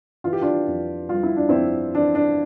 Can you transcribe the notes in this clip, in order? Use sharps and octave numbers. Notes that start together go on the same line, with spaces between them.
E3 F4
G4
D4 F4
F2
G3 F4
E4
D4
F2 C4 E4
E3 D4
D4